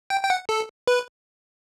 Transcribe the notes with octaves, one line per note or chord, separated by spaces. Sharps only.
G5
G5
F#5
A4
B4